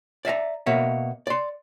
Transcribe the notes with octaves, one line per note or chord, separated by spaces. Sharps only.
D5 E5 F5 A#5
B2 A#3 C#5 E5
D5 C6